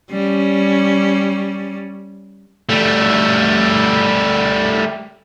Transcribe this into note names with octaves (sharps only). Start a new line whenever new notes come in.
G3 C#4
G3 A3